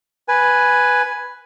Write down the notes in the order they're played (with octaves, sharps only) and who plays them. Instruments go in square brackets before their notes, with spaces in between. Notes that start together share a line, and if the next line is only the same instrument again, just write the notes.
[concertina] B4 G#5